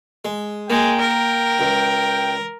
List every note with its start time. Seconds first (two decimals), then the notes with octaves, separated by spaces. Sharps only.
0.25 G#3
0.70 G#3 A#3 G5
1.01 A#4
1.60 C#2